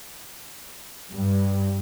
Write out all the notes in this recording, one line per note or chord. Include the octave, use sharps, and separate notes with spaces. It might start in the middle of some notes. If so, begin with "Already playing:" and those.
G2